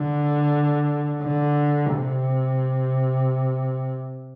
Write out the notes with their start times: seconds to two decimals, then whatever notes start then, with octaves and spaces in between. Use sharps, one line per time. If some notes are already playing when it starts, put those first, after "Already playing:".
Already playing: D3
1.22 D3
1.95 C3